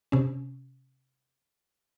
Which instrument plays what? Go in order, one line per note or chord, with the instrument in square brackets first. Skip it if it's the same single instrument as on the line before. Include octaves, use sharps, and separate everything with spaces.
[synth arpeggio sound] C3 C#4